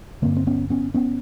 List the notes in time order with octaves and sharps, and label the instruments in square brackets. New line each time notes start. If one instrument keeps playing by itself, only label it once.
[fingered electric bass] G2 D3 A#3 C4
C4
B3 C#4
B3 C#4
B3 C#4